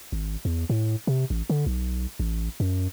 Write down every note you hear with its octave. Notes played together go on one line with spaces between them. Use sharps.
G#1
E2
A2
C3
A1
D3
B1
A1
F#2